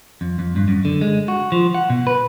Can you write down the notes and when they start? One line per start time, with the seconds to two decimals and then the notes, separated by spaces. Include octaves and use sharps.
0.21 F2
0.39 F2
0.56 G2
0.68 F#2
0.85 D3
1.01 G#3
1.28 F#4
1.52 F3
1.75 F#5
1.90 B2
2.07 B4